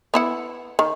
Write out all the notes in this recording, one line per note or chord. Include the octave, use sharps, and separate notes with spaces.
B3 E4 F#5
D#3